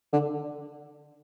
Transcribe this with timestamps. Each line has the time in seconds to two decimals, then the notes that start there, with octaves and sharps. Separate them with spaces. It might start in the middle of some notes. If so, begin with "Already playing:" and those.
0.13 D3